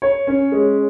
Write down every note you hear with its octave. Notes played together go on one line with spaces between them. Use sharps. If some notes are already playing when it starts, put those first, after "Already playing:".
C#5
C#4
G#3